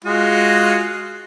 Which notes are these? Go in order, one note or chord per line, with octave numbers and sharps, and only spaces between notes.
G#3 F4 F#4